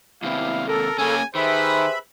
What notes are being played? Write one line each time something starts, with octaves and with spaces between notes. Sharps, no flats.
D#2 C3 G3 B3 E4 F5
A4 A#4
C#3 A#3 C#4 G#5
D#3 G4 G#4 B4 C5 E5 B5